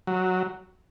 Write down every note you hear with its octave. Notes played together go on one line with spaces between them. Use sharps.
F#3